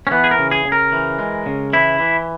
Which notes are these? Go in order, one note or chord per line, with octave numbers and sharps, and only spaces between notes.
C#4
E3 B3
G#4
A#4
C#3
G#4
C#3
A#4
E3
G#3
C#3
E3 E4
E3